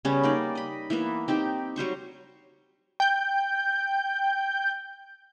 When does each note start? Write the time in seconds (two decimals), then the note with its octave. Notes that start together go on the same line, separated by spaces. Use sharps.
0.05 C#3 G3 B3 C#4
0.23 A#3 D#4 D5
0.55 D#5 B5
0.90 E3 A#3 B3 E5
1.28 C4 D#4 G4
1.76 F#3 G3 C5 C#6
3.00 G5 G6